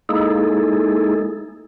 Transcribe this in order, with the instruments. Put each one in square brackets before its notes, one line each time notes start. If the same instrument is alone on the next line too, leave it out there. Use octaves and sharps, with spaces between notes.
[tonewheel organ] G#3 A#3 D#4 E4 G#4 A4